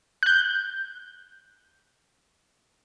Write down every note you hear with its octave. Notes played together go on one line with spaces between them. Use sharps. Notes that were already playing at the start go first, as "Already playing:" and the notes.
F#6 G6